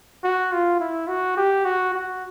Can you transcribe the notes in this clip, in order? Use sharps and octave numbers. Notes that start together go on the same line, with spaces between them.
F#4
F4
E4
F#4
G4
F#4
F#4